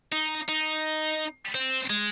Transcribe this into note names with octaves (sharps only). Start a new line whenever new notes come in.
D#4
D#4
C4
G#3